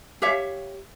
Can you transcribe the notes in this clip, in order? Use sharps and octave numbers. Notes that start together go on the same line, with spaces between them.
G4 C#5 E5 F5